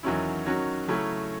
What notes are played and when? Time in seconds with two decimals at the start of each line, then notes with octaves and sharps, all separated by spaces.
0.03 E2 D#3 F#3 C#4 E4
0.46 D#3 F#3 C#4 F#4
0.88 C#3 F#3 A3 C#4 E4